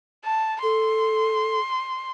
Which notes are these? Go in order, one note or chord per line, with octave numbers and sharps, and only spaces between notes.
A5
A4 C6